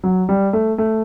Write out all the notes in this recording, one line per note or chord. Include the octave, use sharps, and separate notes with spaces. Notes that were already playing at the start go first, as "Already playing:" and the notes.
F#3
G3
A3
A3